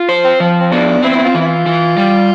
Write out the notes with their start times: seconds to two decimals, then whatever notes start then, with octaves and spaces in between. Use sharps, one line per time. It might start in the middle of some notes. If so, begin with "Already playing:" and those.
Already playing: F4
0.09 C5
0.24 C4
0.40 F3
0.60 C4
0.72 B3 D4
1.03 C4 E4
1.15 E4
1.24 F4
1.35 E3
1.40 E4
1.46 F4
1.66 E3
1.97 G3